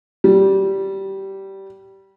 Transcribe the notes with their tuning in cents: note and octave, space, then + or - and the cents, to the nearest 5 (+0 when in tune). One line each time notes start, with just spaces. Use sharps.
G3 -15